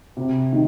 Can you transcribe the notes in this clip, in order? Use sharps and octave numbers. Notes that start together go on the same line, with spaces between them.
C3
D#3